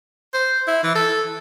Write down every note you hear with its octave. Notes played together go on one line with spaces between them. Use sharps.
C5
E4
E3
A4